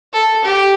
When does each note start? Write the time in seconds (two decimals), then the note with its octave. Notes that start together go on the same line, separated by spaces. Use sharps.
0.13 A4
0.45 G4